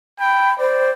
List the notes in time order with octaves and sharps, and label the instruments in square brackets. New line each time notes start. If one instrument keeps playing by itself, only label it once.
[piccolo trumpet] G5 [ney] B5
[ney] C5 [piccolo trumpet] D5